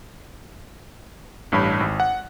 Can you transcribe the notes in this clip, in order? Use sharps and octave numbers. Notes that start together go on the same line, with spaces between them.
A1 G2 C#5 B5
G#1
F#5